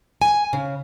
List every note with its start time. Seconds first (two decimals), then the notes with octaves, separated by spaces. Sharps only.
0.22 G#5
0.53 C#3